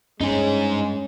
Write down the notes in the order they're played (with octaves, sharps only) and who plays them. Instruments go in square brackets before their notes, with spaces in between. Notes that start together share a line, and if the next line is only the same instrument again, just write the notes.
[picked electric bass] G2 [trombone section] G#3 [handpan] C#4 [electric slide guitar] D#4 G#4